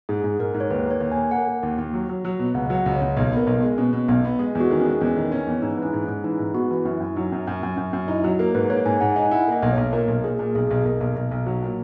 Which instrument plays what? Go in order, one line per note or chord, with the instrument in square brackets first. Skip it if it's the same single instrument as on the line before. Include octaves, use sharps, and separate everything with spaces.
[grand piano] G#2 [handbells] G#4
[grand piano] G#2
[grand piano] G#2 [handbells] A#4
[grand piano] G#2
[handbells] C#5
[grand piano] D#2 [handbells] B4
[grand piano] A#3 [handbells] C#5
[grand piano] D#2
[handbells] G#5
[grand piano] A#3
[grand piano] A#3 [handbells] F#5
[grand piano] A#3
D#2
D#2
F#3
F#3
F#3
B2
[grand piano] C#2 [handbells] F#5
[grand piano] F#3
[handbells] F#5
[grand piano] C#2
[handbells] C#5
[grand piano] C#2
B1
[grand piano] B3 [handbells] A#4
[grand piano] B1
[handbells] B3
[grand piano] G#3
[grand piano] B2 [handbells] C#4
[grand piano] B2
[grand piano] B1 [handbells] B3
[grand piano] B3
[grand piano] G#3 [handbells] G#4
[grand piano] E2
[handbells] F#4
[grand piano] D#3
[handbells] C#4
[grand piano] G#3
[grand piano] E2 [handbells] C#4
[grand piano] D#3
C#4
E2
[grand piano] G#2 [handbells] D#4
[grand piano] E3
[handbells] C#4
[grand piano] G#2
[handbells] C#4
[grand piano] G#2
[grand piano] E3 [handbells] D#4
[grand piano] G#2
[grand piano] B3 [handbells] F#4
[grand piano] E3
[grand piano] F#2 [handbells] E4
[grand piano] F#2
[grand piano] F#3 [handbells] D#4
[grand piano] F#2
F#2
F#2
F#2
F#2
[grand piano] D#4 [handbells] E4
[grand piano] F#3 [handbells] F#4
[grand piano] A#3 [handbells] A#4
[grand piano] G#2 [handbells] B4
[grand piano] A#3 [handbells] C#5
[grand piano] G#2 [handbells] G#5
[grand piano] G#2 [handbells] F#5
[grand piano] D#4 [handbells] G#5
[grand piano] E4 [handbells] F#5
[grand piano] A#3 [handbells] D#5
[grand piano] B1
[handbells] C#5
[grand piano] B1
[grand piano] A#2 [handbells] A#4
[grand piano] B1
[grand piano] A#2 [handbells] G#4
[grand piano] A#2
[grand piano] B1 [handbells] G#4
[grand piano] B1
[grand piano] B1 [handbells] A#4
[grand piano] B1
B1
B1
F#3
A#2